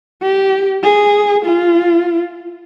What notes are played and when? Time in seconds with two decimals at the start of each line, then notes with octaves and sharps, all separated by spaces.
0.22 G4
0.84 G#4
1.46 F4